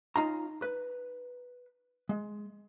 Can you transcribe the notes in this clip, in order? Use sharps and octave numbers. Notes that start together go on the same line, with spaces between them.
C#4 D#4 F4 A#5
B4
G#3